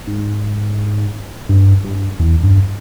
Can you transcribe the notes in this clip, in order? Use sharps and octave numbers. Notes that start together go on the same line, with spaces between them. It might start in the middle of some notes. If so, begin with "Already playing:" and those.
G#2
G2
G2
E2
G2